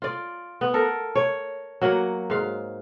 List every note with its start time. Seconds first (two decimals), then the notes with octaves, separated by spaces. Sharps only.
0.02 F4 D5
0.61 B3
0.74 A4 A#4
1.15 C#5
1.81 F#3 A#3 F#5
2.30 G#2 F5